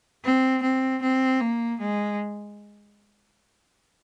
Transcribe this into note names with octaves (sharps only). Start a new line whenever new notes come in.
C4
C4
C4
A#3
G#3